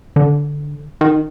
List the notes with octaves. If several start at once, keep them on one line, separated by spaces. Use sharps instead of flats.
D3
D#3